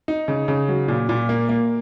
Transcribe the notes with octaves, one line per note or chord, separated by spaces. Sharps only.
D#4
C#3
C#3
F#3
A#2
A#2
A#3
A#3